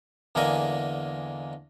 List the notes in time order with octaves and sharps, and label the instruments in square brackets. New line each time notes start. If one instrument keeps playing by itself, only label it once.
[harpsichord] E2 D3 G#3 A#3 A#4 G#5